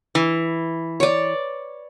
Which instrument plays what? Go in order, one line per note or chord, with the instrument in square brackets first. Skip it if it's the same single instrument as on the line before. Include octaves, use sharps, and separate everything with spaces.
[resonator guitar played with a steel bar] E3
[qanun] C#5 D5